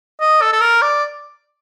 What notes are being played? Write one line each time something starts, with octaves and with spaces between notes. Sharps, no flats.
D#5
A4
A4
A#4
D5